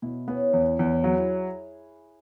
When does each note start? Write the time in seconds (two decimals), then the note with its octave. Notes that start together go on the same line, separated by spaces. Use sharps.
0.02 B2 E4
0.28 B3 C#4
0.53 E2 E4
0.67 C#4
0.79 E2 E4
0.92 C#5
1.04 F#3 G#4
1.17 E4